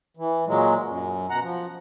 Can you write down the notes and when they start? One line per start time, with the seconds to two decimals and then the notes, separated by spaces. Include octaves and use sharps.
0.17 E3
0.47 A#2 F#3 G#3
0.87 F#2
1.30 B2 F#5 A#5
1.42 F3